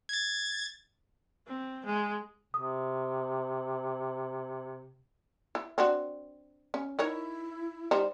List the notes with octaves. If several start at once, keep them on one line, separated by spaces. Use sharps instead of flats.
G#6 A6
C4
G#3
C3 D#6
E4
C4 D4 F#4
C#4
D#4 E4 A#4 C#5
G3 D#4 C5